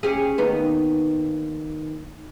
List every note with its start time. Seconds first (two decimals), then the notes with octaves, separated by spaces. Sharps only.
0.03 C#4 G4 G#4
0.38 D#2 B3 D#4